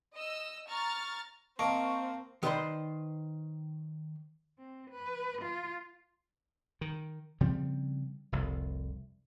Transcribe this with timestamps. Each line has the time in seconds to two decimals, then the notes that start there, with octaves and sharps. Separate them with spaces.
0.13 D#5 E6
0.68 A#5 C#6 F6 A6
1.59 A#3 C4 A#4 D#5 A5 C#6 D7
2.43 D#3 A4 B4 C5 D5 C6
4.59 C4
4.91 B4
5.42 F4
6.81 D#3
7.41 C#3 F3 G3 C4
8.32 F1 C2